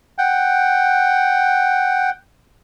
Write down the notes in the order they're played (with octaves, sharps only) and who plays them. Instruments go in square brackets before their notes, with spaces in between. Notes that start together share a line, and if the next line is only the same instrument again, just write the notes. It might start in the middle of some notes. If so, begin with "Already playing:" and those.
[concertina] F#5 G5